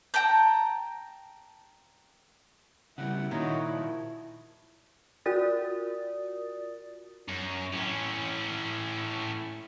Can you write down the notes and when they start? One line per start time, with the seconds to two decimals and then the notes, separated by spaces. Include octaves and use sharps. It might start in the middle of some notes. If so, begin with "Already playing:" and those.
0.14 G5 A5 A#5 G6
2.98 C#3 G3 E4 F#5
3.31 A#2 D#3 D#4 F#4 C#5
3.72 F3
5.26 F4 F#4 A#4 D5 D#6 A6
7.29 F#2
7.73 A2 C#4